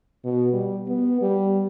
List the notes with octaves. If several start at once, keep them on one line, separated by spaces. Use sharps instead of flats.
B2
G3
B3
G3